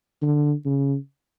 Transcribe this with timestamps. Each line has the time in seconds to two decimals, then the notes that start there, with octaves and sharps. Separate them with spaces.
0.22 D3
0.65 C#3